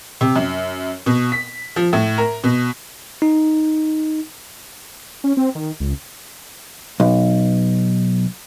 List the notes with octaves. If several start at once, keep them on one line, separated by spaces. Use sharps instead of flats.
C3
F#2
B2
B6
F3
A2
A#4
B2
D#4
C#4
C4
D#3
C#2
B1